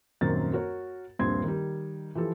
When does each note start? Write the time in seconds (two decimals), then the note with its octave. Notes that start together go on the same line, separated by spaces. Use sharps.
0.21 D#1 F#2 D#3 C4 A6
0.53 F#4 A#4 C#5
1.19 D#1 A#1 G2 C4 C6 G#6
1.44 D#3 G3
2.15 E3 F3 G4 A4